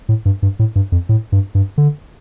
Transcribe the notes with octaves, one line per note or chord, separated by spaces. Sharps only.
A2
G2
G2
A2
G2
F2
A2
G2
G2
D3